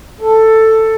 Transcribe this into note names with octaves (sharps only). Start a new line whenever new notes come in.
A4